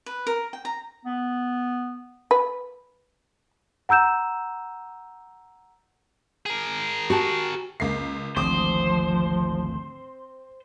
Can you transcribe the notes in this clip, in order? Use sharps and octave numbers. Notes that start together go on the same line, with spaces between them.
B4
A#4
G5
A#5
B3
B4
F#5 A#5 E6 G6 E7
G#4 A#4
F#4 G4 A5
C#2 A#3 C7
G#1 D2 F3 C4 C5 D6 D#6